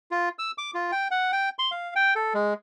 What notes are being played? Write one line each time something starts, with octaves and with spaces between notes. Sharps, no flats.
F4
E6
D6
F4
G5
F#5
G5
C6
F5
G5
A4
G#3